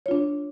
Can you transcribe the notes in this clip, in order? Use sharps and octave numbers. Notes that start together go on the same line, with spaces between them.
D4 F4 C#5